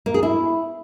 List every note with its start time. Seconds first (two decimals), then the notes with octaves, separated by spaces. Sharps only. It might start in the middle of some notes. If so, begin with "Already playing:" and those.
0.06 A#3
0.14 G#4
0.23 E4